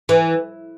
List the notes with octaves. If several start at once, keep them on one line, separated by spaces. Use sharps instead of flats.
E3